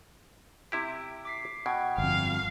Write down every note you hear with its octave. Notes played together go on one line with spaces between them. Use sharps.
C3 E4 G4
D6 B6 C7
B2 F#5 G5 G#6
G1 F2 F5